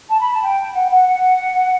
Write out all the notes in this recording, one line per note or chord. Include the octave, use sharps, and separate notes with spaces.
A5
B5
A5
G5
F#5
F#5
F#5